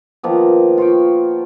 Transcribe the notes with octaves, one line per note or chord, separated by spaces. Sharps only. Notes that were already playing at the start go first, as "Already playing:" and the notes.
D#3 F3 A#3 B3
F4 C#5 G5